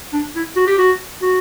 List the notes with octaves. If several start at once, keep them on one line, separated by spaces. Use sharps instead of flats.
D4
E4
F#4
G4
F#4
F#4